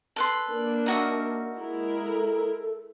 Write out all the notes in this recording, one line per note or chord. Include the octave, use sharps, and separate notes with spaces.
A4 B4 C6
A#3 D4 A#4
D#4 F#4 E5
G#3 E4 A#4
A4